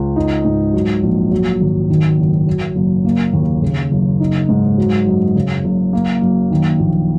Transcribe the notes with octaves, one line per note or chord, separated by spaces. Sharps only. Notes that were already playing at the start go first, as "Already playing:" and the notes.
Already playing: C#2
D#4
G#2
F#3
A#1
F#3
G#1
D#3
F#1
F#3
F#1
A#3
D#2
C#3
F#1
D#4
G#2
F#3
F#2
C#3
F#1
A#3
F#2
D#3
A#1